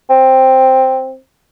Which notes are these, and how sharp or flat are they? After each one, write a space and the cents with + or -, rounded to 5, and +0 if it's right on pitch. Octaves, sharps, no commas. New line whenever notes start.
C4 +5